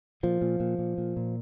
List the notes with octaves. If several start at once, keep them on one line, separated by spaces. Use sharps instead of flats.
A#2 F3
A#2
A#2
A#2
A#2
A#2